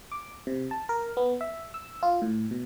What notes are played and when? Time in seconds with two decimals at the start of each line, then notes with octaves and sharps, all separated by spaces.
0.12 D6
0.47 C3
0.71 A5
0.89 A#4
1.17 B3
1.41 E5
1.74 E6
2.03 F4
2.22 A2
2.51 B2